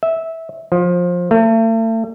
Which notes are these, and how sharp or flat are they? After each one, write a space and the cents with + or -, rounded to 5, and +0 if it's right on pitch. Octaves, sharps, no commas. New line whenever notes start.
E5 -15
F3 +20
A3 +40